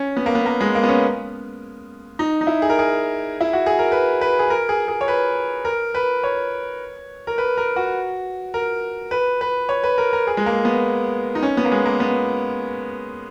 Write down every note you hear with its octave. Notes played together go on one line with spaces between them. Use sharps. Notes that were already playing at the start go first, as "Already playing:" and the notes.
Already playing: C#4
B3
A#3
B3
A#3
G#3
A#3
B3
C#4
D#4
D#4
E4
G#4
A#4
G#4
E4
F#4
G#4
A#4
B4
B4
G#4
A#4
G#4
G#4
C#5
B4
A#4
B4
C#5
A#4
B4
A#4
F#4
A#4
B4
B4
C#5
B4
A#4
A#4
G#4
G#3
A#3
B3
D#4
C#4
B3
A#3
G#3
A#3
B3